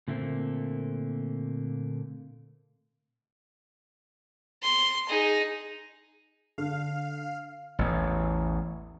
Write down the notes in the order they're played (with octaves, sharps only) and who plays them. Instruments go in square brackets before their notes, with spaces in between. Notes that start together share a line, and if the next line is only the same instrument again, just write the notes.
[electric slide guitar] A#2 D3 A3 A#3 C4
[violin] C6
D#4 G#4
[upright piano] D3 [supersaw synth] F5
[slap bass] A1 E2